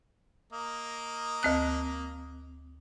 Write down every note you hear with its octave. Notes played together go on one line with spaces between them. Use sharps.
A#3 D#5
D2 C4 F#6